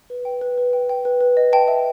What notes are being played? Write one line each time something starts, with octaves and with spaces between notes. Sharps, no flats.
B4
G5
B4
B4
G5
G5
B4
B4
D#5
B4 G5 A5
E5